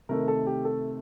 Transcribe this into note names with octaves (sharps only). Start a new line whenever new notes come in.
C3 D#3 A3 A#4
A4
G4
A4